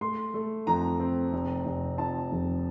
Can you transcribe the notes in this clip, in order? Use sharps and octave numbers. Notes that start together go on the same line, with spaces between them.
A3 C6
A3
F2 A#5
C4
F1
F1
F2 A5
F1